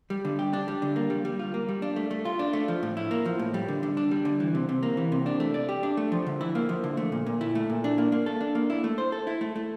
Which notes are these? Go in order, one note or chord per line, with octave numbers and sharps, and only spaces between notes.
G3
D3
G4
D4
G3
D3
A#3
G3
G3
F4
A#3
G3
D4
A3
A3
F4
D4
A3
F3
A2
E4
A#3
F3
A2
G3
D3
D3
D4
G3
D3
E3
C3
C3
A#3
E3
C3
D4
A3
D5
G4
D4
A3
F3
D3
E4
A#3
F3
D3
A3
A#2
A#2
E4
A3
A#2
D4
A#3
A#3
A4
D4
A#3
E4
A3
C5
A4
E4
A3
A3